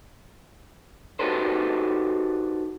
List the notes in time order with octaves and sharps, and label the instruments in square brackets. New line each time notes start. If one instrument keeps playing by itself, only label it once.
[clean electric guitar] D#4 F#4 G4 A4 B4 C5